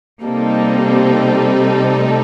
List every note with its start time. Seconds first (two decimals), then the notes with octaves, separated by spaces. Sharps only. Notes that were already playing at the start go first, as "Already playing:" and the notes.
0.22 C3 G3 A#3 C4 D#4 A4
1.91 A3